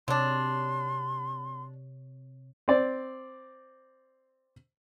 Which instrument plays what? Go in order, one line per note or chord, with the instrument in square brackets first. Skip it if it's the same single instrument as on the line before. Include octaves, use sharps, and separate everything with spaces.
[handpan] C3 C#5 [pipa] F#3 D4 [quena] C6
[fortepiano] C4 D5